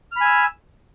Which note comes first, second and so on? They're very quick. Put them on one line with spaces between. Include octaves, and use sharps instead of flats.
F6 B5 G#5 E6